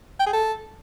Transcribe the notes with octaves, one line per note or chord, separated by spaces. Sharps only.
G5
G#4
A4